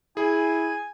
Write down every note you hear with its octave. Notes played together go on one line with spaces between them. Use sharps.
E4 G#4 G#5